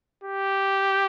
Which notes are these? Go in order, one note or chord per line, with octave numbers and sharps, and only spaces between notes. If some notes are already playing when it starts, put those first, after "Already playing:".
G4